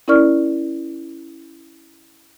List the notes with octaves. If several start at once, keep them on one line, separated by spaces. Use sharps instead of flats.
C#4 E4 A#4 D5 C#6 F6